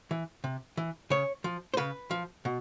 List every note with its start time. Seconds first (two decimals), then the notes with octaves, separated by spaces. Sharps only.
0.11 E3
0.44 C3
0.77 E3
1.10 C#3 C#5
1.44 F3
1.74 C5
1.77 C#3 B4
2.11 F3
2.45 B2